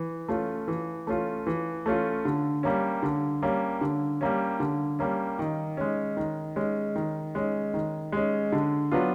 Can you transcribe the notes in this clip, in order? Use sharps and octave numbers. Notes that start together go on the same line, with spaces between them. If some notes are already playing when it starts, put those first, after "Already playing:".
Already playing: E3
A3 C#4 F4
E3
A3 C#4 F4
E3
A3 C#4 F4
D3
G3 A#3 C#4
D3
G3 A#3 C#4
D3
G3 A#3 C#4
D3
G3 A#3 C#4
D#3
G#3 C#4
D#3
G#3 C#4
D#3
G#3 C#4
D#3
G#3 C#4
D3
F#3 B3 D4 F4